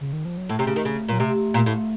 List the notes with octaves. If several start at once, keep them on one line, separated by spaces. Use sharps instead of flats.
C#3
D#3
F3
F#3
A2 A3
C3
C#3
D#3
C#3
A#2 F#3
C3 A3
A#2
A2